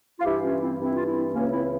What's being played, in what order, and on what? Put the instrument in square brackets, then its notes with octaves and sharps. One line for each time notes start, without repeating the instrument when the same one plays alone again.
[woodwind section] F4
G2 E3 E4 G4
C#4 F4
C4 E4
G2 E3 C4 E4
F4
C4 E4
C#2 C#3 E3 A#3 C#4
C4 E4